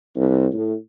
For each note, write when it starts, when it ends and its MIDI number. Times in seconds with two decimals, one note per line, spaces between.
0.16 0.47 36
0.53 0.74 45